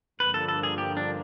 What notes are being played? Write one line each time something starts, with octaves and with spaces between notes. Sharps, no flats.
G2 D3 F3 A#3 B4
A4
A4
G#4
G4
D4